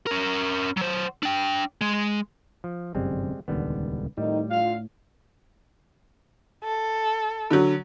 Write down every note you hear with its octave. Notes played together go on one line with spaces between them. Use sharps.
C#4 A#4
F#3 C5
D4 G5
G#3
F3
G1 F#2 C3 G3 G#3 C4
D#1 C#2 D3 D#3 G3 B3
F2 A2 D#3 G3 D#4
D3 F4 F5
A4
D3 F#3